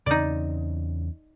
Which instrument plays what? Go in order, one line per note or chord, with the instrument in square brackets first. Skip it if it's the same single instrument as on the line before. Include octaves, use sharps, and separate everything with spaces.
[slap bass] E2 C#3 C4 [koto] D#4 D5